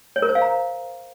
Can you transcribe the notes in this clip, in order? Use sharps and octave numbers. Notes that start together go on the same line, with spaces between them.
C#5
A#4
C5
F5
A#5